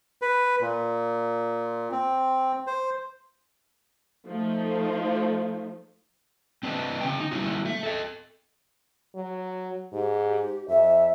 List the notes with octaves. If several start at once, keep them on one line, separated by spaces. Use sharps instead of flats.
B4
A#2
C4
C5
F3 A3 D#4
C4 D4 B4 C5 D#5
C#3 C#4 G5
D#4
G3 A#3 C4 C#4 E4 F#4
A3 E5
A4 D#5
F#3
G#2 G4
F2 E5